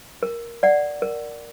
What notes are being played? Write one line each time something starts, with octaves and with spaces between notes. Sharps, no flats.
A#4
D5 F#5
A#4